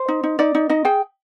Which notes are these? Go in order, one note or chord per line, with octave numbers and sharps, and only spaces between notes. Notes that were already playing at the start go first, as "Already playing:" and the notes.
Already playing: C5
D#4
D#4
D#4 D5
D#4
D#4 D#5
G#4 G5